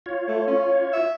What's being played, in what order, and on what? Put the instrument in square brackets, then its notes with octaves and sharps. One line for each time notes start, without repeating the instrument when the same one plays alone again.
[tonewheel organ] F4 C#5
[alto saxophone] A3
C#4
E5